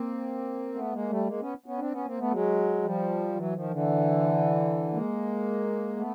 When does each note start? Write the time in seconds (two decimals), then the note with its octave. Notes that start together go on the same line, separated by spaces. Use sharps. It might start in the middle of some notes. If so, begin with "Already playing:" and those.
Already playing: A#3 C4
0.74 A3 B3
0.93 G#3 A#3
1.09 G3 A3
1.27 G#3 A#3
1.40 B3 C#4
1.66 B3 C#4
1.79 C4 D4
1.92 B3 C#4
2.05 A#3 C4
2.19 A3 B3
2.31 F#3 G#3
2.83 F3 G3
3.36 E3 F#3
3.54 D#3 F3
3.70 D3 E3
4.92 G#3 A#3
5.97 A3 B3